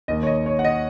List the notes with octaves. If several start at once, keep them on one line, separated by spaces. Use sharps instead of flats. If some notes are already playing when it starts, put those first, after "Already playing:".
D#2 D#3 D#5
C#5
D#5
C#5
F#5
D#5